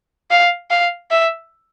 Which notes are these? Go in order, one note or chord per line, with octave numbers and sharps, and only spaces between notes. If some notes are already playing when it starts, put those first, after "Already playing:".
F5
F5
E5